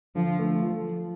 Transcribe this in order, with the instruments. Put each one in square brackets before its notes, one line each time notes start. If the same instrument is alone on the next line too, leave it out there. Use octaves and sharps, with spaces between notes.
[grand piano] D3 [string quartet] F3
[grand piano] A3
F3